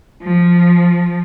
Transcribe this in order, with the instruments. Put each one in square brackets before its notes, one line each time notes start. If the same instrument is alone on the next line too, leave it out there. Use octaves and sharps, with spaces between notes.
[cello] F3